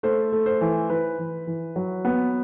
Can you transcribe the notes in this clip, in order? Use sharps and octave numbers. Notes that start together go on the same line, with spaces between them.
A3 C5
A3
C5
E3
E3 B4
E3
E3
F#3
B3